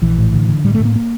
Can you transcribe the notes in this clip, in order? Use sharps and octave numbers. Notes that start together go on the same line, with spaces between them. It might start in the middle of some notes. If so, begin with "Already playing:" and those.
A#1 E3
A2
D3
D3
A2 G3
A3
A2
A#3
A#3